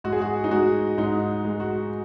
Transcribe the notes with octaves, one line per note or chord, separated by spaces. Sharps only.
G#2 F#4
G#4
F#4
D#4
G#3 F#4
G#2 D#4
G#3
F#4